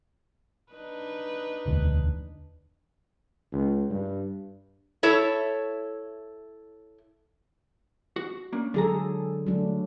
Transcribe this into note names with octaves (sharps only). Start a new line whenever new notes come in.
D4 D#4 B4
E1 D2
C#2
G2
E4 A4 C#5 E5
F#4
A#3 C#4 D4
D3 F#3 G#4 A4 A#5
F#3 A3 D4